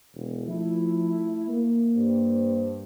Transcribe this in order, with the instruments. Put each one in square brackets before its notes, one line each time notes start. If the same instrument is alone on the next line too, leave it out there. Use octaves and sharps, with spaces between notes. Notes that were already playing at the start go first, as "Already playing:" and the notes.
[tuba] E1
[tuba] F3 [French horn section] A3 E4
[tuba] A#3
[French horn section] G2 C5